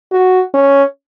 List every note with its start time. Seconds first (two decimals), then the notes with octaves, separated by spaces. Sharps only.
0.12 F#4
0.54 C#4